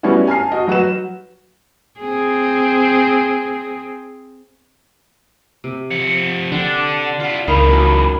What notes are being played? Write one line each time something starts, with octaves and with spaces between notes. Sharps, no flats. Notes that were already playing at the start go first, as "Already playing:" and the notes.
G3 B3 C#4 D4 E4 F#4
G#5 A5 F6 C7
F#4 D#5
F#3 F#4 B4 E7
C4 G#4
C3
F3 F#5
D3 D4 F#5 G5
E4 F4
C#2 E3 F3 D#4 A#4 F5 B5
F#3 C#4